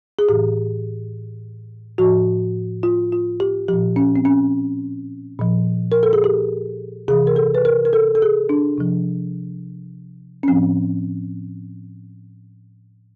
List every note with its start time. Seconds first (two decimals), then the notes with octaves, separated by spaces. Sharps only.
0.19 G#4
0.29 A2 E3 G4
1.98 A2 F3 F#4
2.83 F4
3.12 F4
3.40 G4
3.68 A#2 F3 G4
3.96 C#4
4.16 C4
4.25 C#4
5.39 A#2 F3
5.92 A#4
6.03 A4
6.13 G#4
6.24 G4
7.08 C3 E3 G#4
7.27 A#4
7.36 A4
7.55 B4
7.65 A#4
7.85 A#4
7.93 A4
8.15 A4
8.22 G#4
8.49 D4
8.78 C3 F3
10.43 C#4
10.48 A2 F3 C4